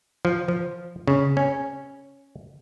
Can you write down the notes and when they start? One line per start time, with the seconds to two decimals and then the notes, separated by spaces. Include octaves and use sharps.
0.25 F3
0.48 F3
1.07 C#3
1.37 C#4